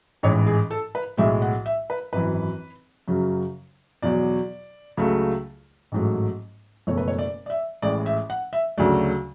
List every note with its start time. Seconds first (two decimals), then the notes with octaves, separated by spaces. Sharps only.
0.23 A1 G#2 E3 C#5
0.46 G#4
0.71 A4
0.95 B4
1.17 B1 A2 G#3 E5
1.42 F#5
1.66 E5
1.90 B4
2.13 G#1 F#2 E3 B4
3.08 F#2 C#3 F#3
4.02 E2 B2 F#3 D5
4.97 C#2 C#3 F#3 A3
5.92 A1 G#2 F#3 A3
6.87 F#1 E2 B2 A3 C#5
6.97 B4
7.08 C#5
7.19 D5
7.46 D5
7.50 E5
7.82 A1 A2 G#3 D5
8.06 E5
8.30 F#5
8.53 E5
8.78 D2 C#3 F#3 A3 D5